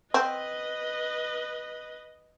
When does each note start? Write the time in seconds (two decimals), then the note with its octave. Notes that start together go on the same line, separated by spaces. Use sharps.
0.14 C4 B4 D#5